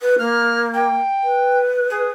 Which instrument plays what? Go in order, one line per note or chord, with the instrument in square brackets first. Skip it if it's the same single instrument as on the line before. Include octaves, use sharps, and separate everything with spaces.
[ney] B4
[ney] A#3 [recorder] F6
[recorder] G5
[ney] B4
[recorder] G#4